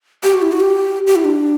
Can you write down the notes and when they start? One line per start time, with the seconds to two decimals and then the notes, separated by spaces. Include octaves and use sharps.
0.23 G4
0.34 F#4
0.42 E4
0.52 F#4
0.60 G4
1.07 G4
1.16 E4
1.25 D4